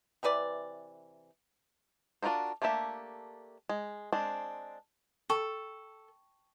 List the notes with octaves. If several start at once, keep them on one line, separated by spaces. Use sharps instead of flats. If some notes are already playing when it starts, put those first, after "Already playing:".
C3 E3 B4 D5
D4 F4 F#4 A#4 C5
A3 A#3 D4 G4 E5
G#3
G#3 C4 D4
A4 G5 A5 C#6